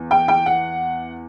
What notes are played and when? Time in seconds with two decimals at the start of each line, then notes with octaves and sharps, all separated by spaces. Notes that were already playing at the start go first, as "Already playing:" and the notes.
Already playing: E2
0.11 G5
0.28 G5
0.46 F#5